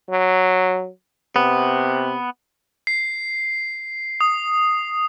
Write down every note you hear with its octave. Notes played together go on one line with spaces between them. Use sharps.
F#3
C3 B3
C7
D#6